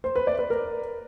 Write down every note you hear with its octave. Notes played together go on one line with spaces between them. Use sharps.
C5
B4
D5
B4
A#4